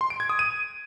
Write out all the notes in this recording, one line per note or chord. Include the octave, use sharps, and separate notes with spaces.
C6
D7
G#6
D#6
D#7